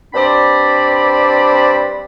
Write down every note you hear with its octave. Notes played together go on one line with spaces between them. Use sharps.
G2 C4 D4 C5 D5 B5